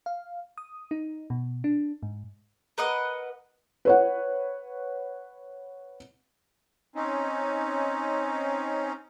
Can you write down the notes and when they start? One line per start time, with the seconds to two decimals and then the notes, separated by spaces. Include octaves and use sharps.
0.06 F5
0.58 D#6
0.91 D#4
1.30 B2
1.64 D4
2.03 G#2
2.78 A#4 B4 D#5 F#5
3.85 B4 C#5 F#5
6.95 C4 C#4 D#4